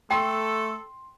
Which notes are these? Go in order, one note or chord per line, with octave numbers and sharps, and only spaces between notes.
A3 A4 G5 C6